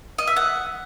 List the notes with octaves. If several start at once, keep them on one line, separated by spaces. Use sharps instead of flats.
D#5
E5
F#5